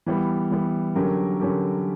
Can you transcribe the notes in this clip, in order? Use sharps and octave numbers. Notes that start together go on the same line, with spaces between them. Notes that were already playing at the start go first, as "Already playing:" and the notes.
E3 G3 B3
E3 G3 B3
D3 F#3 C#4 G4 A#4
D3 F#3 C#4 G4 A#4